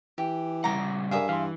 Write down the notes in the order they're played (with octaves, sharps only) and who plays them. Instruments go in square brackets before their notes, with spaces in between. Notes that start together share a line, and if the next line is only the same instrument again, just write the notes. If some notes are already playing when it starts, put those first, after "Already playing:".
[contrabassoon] E3 [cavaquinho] G4
[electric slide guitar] C#3 G3 F#5 [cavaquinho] A#5 D6
[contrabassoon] G2 [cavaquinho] G#4 E5 D#6 [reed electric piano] A#4 D5 F5
[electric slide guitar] E3 [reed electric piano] F5 C6